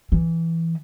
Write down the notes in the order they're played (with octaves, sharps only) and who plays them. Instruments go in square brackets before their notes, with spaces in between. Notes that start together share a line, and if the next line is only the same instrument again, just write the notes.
[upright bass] E3